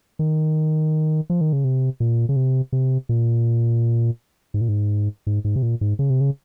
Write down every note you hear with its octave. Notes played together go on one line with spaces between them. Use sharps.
D#3
F3
D#3
C#3
C3
A#2
C#3
C3
C3
A#2
G#2
A#2
G#2
G#2
G#2
C3
A#2
G#2
C#3
C3
C#3